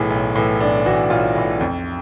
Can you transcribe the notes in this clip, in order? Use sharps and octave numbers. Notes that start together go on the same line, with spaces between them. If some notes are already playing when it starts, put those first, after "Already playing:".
Already playing: B1 A2 E3 G#4
B1
A2 E3
B1 D4
A2 E3 F#4
B1 F4
A2 E3
F2